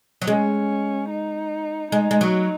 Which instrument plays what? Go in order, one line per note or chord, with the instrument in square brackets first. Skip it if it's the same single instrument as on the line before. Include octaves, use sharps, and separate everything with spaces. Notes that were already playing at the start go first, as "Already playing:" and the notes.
[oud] F#3
[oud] G#3 [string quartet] C#4
[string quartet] D#4
[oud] G#3 [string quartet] D#4
[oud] G#3
F#3